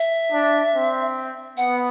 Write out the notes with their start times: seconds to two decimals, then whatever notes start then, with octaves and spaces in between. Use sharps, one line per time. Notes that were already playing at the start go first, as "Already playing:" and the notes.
Already playing: E5
0.32 D4
0.74 C4
1.57 B3 F#5